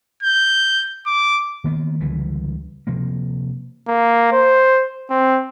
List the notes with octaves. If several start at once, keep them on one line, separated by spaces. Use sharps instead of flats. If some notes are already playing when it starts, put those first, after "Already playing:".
G6
D6
D#3 A#3 B3
C#2 D3 E3 G3
C3 F3 A#3
A#3
C5
C4